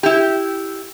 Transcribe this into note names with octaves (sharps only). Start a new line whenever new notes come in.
E4 G4